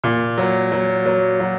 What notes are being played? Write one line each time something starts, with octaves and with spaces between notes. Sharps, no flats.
A#2
F#3
F#3
F#3
F#3